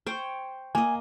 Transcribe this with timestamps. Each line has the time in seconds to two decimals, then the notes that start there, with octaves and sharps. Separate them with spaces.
0.07 C5 C#5 G5
0.75 A#3 D#5 G#5